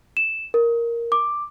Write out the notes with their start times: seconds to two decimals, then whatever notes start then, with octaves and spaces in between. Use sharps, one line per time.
0.17 E7
0.54 A#4
1.12 D6